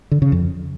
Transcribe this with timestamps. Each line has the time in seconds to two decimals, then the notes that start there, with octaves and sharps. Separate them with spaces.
0.11 D3
0.22 C#3
0.32 F2